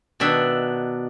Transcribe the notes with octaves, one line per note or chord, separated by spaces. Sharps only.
B2 D#3 D4 E5